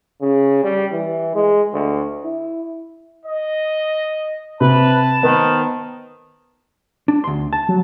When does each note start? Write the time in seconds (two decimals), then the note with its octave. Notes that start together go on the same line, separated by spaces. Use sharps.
0.22 C#3
0.64 G3
0.92 E3
1.35 G#3
1.73 D2
2.25 E4
3.25 D#5
4.61 C3 B4 A5
5.23 D#3 B3 C5
7.08 D4
7.24 D2 C6
7.53 A5
7.69 F#3